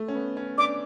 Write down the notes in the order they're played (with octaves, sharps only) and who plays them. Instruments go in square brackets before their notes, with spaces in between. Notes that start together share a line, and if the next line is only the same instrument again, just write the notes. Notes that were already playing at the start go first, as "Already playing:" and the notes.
Already playing: [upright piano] A3
C#4
B3
C#4
[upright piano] D4 [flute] D6